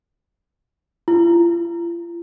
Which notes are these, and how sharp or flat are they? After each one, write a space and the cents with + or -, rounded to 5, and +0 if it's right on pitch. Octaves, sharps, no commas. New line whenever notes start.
F4 -45